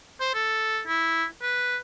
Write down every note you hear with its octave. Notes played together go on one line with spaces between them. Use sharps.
C5
A4
E4
B4